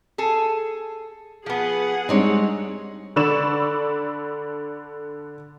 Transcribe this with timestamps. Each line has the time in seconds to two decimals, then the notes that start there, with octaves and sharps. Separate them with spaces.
0.18 G#4 A4
1.46 F3 B3 G#4 F#5
2.09 G3 G#3 C4 D4 D#4 C#5
3.16 D3 D5 B5 C#6 E6 E7